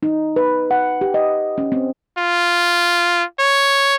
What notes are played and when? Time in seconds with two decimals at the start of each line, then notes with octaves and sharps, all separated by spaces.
0.03 D#4
0.36 B4
0.71 F#5
1.01 G4
1.14 D#5
1.58 C#4
1.72 C4
2.19 F4
3.40 C#5